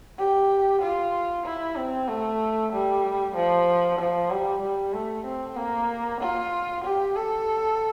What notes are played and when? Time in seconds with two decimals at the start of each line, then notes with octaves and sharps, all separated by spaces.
0.19 G4
0.82 F4
1.46 E4
1.77 C4
2.08 A3
2.73 G3
3.35 F3
3.99 F3
4.31 G3
4.62 G3
4.93 A3
5.25 C4
5.56 A#3
6.21 F4
6.84 G4
7.16 A4